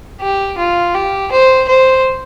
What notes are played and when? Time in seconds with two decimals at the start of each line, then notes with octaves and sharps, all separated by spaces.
0.21 G4
0.58 F4
0.95 G4
1.32 C5
1.68 C5